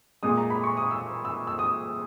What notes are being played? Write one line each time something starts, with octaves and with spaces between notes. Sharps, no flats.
A#2 G#3 D#6
A#5
B5
C#6
D#6
E6
E6
E6
D#6